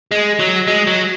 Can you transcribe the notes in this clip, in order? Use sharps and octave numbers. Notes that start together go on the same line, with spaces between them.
G#3
F#3
G#3
F#3